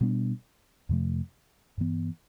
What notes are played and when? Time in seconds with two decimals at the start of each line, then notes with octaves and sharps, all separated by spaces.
0.01 B2 G3 B3 D4
0.89 F2 C3 F3 A3
1.78 G2 E3 B3